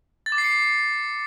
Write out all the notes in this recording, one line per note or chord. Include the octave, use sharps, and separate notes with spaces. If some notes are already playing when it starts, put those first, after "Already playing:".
A6
D6
C7
C#7